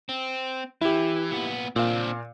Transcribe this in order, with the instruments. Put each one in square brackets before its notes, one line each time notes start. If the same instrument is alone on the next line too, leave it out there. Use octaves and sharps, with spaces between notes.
[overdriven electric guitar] C4
[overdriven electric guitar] E3 [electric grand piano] E4 G4
[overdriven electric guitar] A#2 B3
[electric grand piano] A#2 F5 [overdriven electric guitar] C4 D4